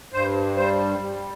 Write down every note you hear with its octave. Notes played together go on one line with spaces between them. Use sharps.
G2 C5
G3 C5
G3